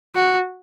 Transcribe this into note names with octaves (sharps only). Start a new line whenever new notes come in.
F#4